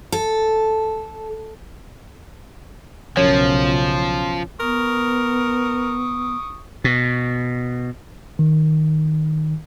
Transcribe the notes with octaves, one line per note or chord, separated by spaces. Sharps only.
A4
B1 F#2 C#3 F3 C#5
B3 A#4 C#6 D#6
B2
D#3